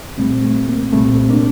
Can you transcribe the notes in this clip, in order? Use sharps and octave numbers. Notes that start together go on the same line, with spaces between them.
C2 A#2 G3 A3 C4
A3
A#3
C2 A#2 G3 A3 C4
A#3 D4